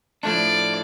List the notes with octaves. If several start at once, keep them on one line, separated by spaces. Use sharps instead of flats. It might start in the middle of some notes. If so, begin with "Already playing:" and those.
A2 F3 A3 D4 D5